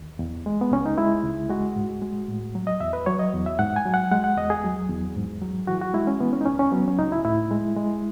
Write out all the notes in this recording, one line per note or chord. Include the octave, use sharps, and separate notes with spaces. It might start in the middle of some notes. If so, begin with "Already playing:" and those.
Already playing: D#2
E2
G#3
B3
C#2 C#4
D#4
G#3 E4
C#2
G#3 F#4
G#2
G#3
A2
F#3
D#5
E2 E5
B4
F#3 C#5
D#5
E2
E5
G#2 F#5
G#5
F#3
F#5
G#3 F#5
F#5
E2 D#5
G#4
F#3
E2
G#2
F#3
E3 F#4
F#4
G#3 E4
C#4
E3 B3
C#4
D#4
C#2 C#4
C#4
F#3 B3
C#4
C#2 D#4
E4
A2 E4
G#3
G#3